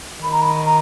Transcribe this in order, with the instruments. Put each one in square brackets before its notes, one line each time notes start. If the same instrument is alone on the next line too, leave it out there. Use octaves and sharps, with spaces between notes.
[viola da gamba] D#3 [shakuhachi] B5
[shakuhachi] A#5
B5
A#5